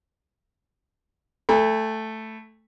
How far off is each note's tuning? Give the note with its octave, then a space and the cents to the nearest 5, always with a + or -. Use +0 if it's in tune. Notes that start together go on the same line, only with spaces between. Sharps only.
A3 +0 G#5 -45 B5 +0